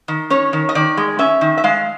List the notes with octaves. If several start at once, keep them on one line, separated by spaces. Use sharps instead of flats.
D#3
C#4 C#5
D#3
D#5
D#3 D5
G#3
C#4 E5
D#3
E5
G#3 F5